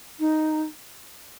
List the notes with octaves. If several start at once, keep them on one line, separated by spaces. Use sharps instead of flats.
D#4